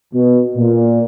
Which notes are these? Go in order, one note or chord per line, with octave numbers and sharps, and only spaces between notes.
B2
A#2